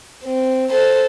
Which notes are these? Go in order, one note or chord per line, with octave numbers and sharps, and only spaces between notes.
C4
A4 C5